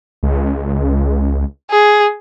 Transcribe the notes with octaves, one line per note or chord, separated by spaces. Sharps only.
C#2
G#4